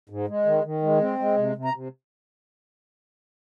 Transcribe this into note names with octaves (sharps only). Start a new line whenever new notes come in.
G#2
G#3
D#3
D#3
G#3
C4
G#3
C3
C3
A#5
C3